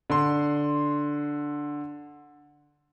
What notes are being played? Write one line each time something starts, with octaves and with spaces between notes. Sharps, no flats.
D3 C6